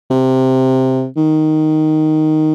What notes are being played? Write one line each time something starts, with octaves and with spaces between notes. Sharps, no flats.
C3
D#3